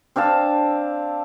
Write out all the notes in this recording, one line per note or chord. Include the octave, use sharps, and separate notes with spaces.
C4 D4 F5 A5